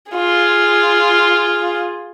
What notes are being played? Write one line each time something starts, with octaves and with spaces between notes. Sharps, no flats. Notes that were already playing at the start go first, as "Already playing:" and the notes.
F4 G#4